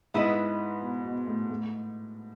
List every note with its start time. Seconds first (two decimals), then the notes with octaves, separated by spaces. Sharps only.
0.14 G#2 B3 E4 B4 D#5
0.82 B2
1.04 B2
1.27 A2
1.50 A2